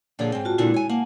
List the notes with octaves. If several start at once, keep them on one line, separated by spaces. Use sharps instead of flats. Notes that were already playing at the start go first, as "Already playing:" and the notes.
A#2 D3 F3 G#4 C#5
G#2 C4 G5
F4 F#4 A5
A#2 D3 G#3 C4 E4
C#5 G#5
A#3 F#5 G#5 A5